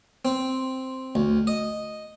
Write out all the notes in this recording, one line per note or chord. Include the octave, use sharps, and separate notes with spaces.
C4
D2
D#5